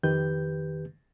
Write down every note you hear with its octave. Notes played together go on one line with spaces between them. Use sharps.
F2 D#3 G4 B4 G6